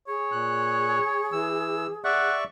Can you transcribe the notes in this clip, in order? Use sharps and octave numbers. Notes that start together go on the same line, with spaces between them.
G#4 C#5
A#2 F#6
E3 E6
D5 E5 F#5 C#6